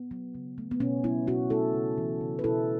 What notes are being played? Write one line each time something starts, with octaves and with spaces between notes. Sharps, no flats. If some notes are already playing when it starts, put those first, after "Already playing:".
Already playing: B3
F#3
C#3
A3
B3
B2 C#4
F#3 B3 E4
B2 C#4 F#4
A3 E4 A4
C#3
E3
C#3
B4
B2 E4 A4